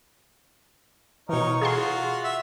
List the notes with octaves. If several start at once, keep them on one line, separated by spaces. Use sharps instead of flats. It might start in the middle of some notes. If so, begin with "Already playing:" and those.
B2 E3 D#4 A#4 C#5
F4 F#4 G#4 A5 C6
E5